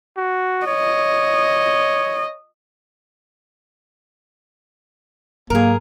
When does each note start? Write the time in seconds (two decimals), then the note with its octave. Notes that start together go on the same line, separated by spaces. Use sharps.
0.17 F#4
0.67 C#5 D#5
5.50 G#2 F#3 A#3 G#4 A#4